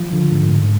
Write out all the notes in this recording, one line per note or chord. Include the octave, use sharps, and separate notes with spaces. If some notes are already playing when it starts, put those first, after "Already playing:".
Already playing: F3
D3
G#2
G#2